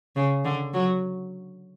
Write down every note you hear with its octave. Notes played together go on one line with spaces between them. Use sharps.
C#3
D3
F#3